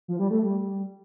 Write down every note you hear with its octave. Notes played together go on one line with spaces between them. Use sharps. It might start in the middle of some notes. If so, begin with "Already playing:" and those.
F3
G3
A3
G3